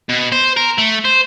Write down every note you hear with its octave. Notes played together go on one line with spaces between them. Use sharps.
B2
C5
A#4
A3
C5